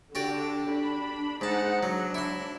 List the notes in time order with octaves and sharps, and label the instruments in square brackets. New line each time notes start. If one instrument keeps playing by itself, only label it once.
[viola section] D3 D4 [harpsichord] F#4 G4 D5
[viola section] D4 B5
[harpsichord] G#2 A5 [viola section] D#4 F#5
[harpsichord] F#3 [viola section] D4
[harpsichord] E4 C6